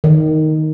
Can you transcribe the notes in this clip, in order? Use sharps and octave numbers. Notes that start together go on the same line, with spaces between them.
D#3